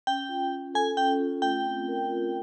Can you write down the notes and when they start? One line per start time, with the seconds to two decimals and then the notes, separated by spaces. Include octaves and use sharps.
0.07 C#4 G5
0.29 F4
0.52 C#4
0.74 A4 G#5
0.97 C#4 G5
1.20 F4
1.42 A3 G5
1.65 C4
1.88 A#4
2.10 F4